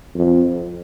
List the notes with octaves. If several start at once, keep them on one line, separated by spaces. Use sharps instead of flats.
F2